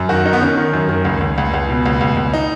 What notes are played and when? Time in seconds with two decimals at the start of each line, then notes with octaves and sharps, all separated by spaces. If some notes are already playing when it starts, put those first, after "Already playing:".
Already playing: F#2
0.09 D#3 F#4
0.25 D#3 D#4
0.33 B3
0.41 D#3 C#4
0.57 D#3
0.73 F#2
0.89 D#3
1.05 C#2
1.21 C#2
1.38 C#2
1.54 C#2
1.69 B2
1.86 C#2
2.01 C#2
2.17 C#2
2.34 D#4